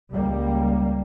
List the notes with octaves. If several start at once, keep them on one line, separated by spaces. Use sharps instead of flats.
C#2 G3 A#3